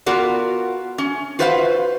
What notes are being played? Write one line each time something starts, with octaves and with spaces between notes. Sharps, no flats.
B3 F4 F#4 A#4 D5
C#4
F4 F#4 B4 C5 E5 F5